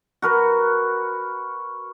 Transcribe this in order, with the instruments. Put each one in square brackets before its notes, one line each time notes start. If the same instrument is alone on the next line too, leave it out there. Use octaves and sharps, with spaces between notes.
[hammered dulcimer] F#4 A#4 B4